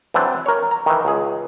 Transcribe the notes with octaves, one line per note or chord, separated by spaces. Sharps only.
E3 F#3 C4 D4
A#4 C#5
A#5
D#3 E3
C#2 G#4